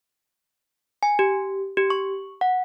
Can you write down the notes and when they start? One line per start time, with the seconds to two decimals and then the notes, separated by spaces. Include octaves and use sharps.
1.03 G#5
1.19 G4
1.77 G4
1.90 C#6
2.41 F#5